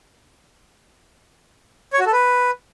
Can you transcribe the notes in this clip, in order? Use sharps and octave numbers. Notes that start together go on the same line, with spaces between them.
C#5
F#4
A4
B4